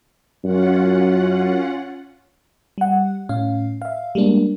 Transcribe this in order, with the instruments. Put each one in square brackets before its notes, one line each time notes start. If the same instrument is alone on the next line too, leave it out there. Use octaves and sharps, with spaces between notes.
[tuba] F#2 [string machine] C#4 F4 F#5
[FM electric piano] G3 F#5
A2 C#4 F5
E5 F5
G3 G#3 A#3 D4